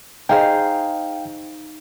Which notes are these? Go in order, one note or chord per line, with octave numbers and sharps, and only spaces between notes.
D#4 G#4 C5 F5 G5